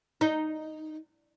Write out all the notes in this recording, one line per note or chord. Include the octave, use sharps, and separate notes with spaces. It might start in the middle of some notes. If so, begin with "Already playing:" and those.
D#4